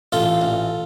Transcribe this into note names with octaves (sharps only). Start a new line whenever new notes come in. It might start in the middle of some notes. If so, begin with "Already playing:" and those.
A1 F4 A4
A1